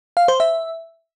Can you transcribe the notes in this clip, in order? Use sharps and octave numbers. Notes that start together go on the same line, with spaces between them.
F5
C5
E5